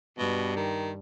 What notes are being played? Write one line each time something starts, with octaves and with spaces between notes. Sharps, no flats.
G2 B2
D#3